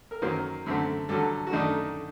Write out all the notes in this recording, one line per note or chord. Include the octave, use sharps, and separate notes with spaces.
A#4
F#2 D#3 F#3 A#3 C5
F#2 D3 A3 C4
G2 D3 F#3 A4
F#4
F#2 D#3 A3 D4 D#4